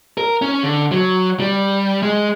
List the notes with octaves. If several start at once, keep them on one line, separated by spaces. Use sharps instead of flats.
A#4
C#4
D3
F#3
G3
G#3